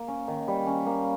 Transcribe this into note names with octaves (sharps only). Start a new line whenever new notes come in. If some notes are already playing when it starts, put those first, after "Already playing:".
Already playing: A#3
C#4
D#3
G3
C#4
A#3